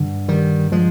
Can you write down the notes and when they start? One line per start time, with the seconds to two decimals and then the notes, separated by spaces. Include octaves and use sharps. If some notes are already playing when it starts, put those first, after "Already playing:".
Already playing: G2 D3
0.28 D#3 G3
0.72 F3 G#3